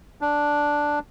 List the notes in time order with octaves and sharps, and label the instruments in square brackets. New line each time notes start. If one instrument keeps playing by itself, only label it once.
[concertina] D4